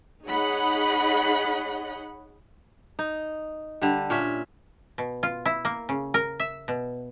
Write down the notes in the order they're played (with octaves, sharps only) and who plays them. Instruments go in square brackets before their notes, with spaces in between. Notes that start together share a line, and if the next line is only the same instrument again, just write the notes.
[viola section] D#4 G#4 C#5 D#5 F#5 B5
[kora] D#4
D3 G3
A#2 C#4 E5
[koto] B2
F4
E4
A#3
C#3
A#4
E5
B2